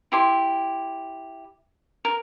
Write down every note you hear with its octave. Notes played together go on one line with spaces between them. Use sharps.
E4 G4 C6
A#4